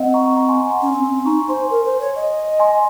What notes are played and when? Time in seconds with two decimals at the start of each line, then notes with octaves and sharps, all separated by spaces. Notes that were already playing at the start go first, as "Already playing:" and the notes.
Already playing: C4 D#5 F#5
0.14 A#5 C#6
0.36 A#5 C#6
0.48 G#5 C6
0.59 G#5 C6
0.70 F#5 A#5
0.82 C#4 G#5 C6
0.92 C4
1.04 C4
1.15 C4
1.25 D#4 A#5 C#6
1.48 C5 G#5 C6
1.70 A#4
1.85 C5
2.00 C#5
2.15 D#5
2.60 G#5 C6